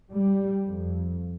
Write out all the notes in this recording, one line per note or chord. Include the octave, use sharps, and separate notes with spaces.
G3
F2